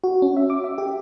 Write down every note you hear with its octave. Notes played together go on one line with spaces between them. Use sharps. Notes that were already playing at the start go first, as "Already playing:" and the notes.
F#4
C#4
E5
D6
E5
G4